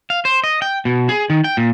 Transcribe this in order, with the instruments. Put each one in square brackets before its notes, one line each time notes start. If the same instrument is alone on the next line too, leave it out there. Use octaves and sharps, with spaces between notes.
[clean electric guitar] F5
C5
D#5
G5
B2
G#4
D#3
G5
A#2